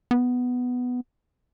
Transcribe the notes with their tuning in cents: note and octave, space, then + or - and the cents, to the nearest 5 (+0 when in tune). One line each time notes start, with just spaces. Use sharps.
B3 +5